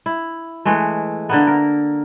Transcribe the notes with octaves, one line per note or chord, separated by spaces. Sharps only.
E4
E3 G#3 A3
D3 A#3 B3
A#4